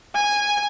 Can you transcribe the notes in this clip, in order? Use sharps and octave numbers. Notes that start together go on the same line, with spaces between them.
G#5